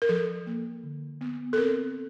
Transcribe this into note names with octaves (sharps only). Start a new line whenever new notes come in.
A#4
F3 A4
A#3
D3
B3
A4
C4 A#4